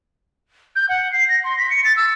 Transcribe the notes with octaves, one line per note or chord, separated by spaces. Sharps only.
G6
F#5
C7
A#6
C6
B6
C#7
A6
E6